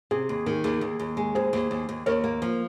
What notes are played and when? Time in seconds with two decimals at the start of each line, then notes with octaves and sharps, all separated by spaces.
0.11 C3 G#4
0.29 D#2
0.46 D#3
0.64 D#2 G#4
0.81 D#2
0.99 D#2
1.17 G#3
1.35 D#2 G#4 C5
1.53 D#2
1.71 D#2
1.89 D#2
2.06 D#2 A#4 C#5
2.24 A#3
2.42 F3